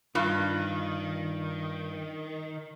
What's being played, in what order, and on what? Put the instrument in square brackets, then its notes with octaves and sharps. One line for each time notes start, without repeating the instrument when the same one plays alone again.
[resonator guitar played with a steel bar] G2 [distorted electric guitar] D#3 [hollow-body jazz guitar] F4